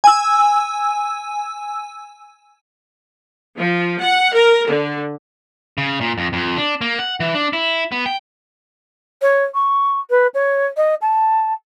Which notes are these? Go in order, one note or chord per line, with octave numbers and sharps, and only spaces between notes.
G#5 E6
F3
F#5
A#4
D3
C#3
A#2
F2
F2
D4
A#3
F#5
E3
D4
E4
B3
G5
C#5
C#6
B4
C#5
D#5
A5